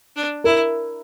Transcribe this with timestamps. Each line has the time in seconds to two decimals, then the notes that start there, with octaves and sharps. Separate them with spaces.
0.16 D4
0.44 E4 A#4